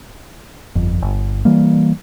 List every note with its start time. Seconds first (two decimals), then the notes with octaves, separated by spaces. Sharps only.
0.75 G1 F2
1.02 G1
1.45 E3 G3 A#3